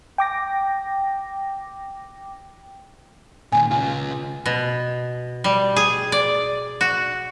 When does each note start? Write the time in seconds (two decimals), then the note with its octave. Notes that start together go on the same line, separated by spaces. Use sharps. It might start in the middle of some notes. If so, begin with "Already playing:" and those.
0.18 G5 D6 A#6
3.52 A#2 D#3 G#5
3.71 C#3 F4
4.46 B2
5.44 G3
5.76 G#4
6.12 D5
6.81 F#4